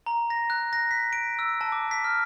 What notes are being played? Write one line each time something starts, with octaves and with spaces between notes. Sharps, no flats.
A#5
A#6
F#6
A#6
B6
D7
E6
A5
D6
B6
F6